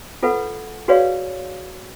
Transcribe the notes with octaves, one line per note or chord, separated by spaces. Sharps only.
F4 A4 B4 F#5
F#4 G#4 B4 C#5 D5 F5